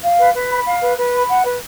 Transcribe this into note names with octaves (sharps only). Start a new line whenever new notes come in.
F5
B4
B4
B5
F5
B4
B4
B5
F#5
B4